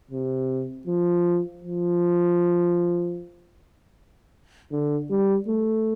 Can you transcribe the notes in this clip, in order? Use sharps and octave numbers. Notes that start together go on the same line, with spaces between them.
C3
F3
F3
D3
G3
A3